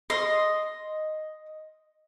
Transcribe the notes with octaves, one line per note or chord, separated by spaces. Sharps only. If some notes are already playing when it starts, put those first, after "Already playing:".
D#5 C6